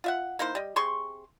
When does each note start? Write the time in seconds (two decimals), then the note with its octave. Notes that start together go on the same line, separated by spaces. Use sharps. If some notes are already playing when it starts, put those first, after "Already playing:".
0.04 F4 E5 F#5
0.39 A#3 D#4 E4 C5
0.55 G3 D#5
0.76 C3 G#4 C6 C#6